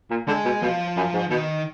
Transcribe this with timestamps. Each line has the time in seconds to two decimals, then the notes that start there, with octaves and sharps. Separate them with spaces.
0.11 A#2
0.28 D3 G#3
0.45 B2
0.62 B2 F3
0.97 F#2
1.14 G#2
1.31 B2 D#3